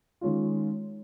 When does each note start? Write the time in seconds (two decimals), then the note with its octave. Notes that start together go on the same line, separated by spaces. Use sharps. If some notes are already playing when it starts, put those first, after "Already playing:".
0.21 D#3 G#3 C#4 F4